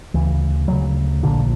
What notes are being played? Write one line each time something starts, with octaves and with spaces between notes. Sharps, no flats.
D2 C#3 E3
D2 C#3 F#3
A#1 A#2 D3